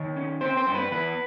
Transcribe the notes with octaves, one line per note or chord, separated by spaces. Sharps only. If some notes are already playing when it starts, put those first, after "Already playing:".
Already playing: D#3 C#5
C#4
C4 C5
C5
G2
B4
E2 B4